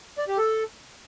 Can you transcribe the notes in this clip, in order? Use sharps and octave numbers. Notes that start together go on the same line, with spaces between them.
D5
G4
A4